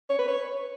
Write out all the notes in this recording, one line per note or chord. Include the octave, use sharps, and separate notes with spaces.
C#5
B4
C#5